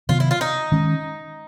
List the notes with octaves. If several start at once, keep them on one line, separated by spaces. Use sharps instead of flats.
C3 D#3 F#3 B3 F4
E4
F4
D#4
D#3 G#3 C#4